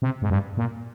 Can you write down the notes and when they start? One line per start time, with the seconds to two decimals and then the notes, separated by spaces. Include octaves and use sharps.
0.02 C3
0.22 G#2
0.30 G2
0.57 A#2